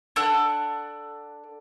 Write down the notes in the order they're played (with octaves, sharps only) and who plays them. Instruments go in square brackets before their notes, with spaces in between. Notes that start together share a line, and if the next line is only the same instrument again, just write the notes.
[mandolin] D4 A4 F#5 F#6